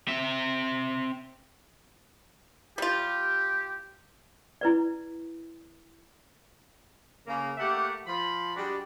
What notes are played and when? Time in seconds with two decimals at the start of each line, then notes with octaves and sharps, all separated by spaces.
0.08 C4 E5
2.78 G3 F4 G4
4.61 E4 B4 D5
7.26 C#3 A#3
7.58 A3 A#3 G4 E5 F#5
8.06 F3 B5
8.54 G3 G#3 D4 F#4 G4